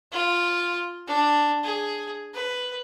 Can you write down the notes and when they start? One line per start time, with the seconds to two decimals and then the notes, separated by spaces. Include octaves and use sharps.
0.12 F4
1.07 D4
1.64 G#4
2.34 B4